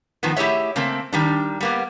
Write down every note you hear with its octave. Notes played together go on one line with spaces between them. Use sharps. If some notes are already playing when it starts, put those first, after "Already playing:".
A2 D#3 F3 B3
A3 E4 G4 G#4 C#5 E5
C#3 A3 A#3 C4
D#3 G3 D4
G3 A#3 B3